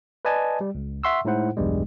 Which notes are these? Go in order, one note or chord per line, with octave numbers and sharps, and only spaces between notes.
B4 D5 D#5 G#5 A5
G3
C#2
E5 F#5 C6 C#6 E6
A2 G#3 D#4 E4 C5 F#5
B1 E2 G2 G3 G#3